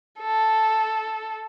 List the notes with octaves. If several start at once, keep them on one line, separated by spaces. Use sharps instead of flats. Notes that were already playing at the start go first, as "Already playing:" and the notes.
A4